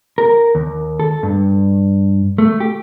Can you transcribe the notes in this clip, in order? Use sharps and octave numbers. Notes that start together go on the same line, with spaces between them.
A#4
D#2
A4
G2
A3
G4